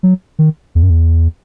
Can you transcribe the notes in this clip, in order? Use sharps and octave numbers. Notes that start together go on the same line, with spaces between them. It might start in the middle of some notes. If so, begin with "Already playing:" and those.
F#3
D#3
E2
F#2
E2